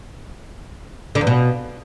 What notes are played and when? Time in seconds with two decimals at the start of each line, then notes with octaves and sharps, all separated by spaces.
1.15 D3
1.21 E2
1.27 B2